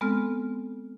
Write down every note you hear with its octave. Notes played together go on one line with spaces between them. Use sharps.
G#3 B3 C4 A4 F6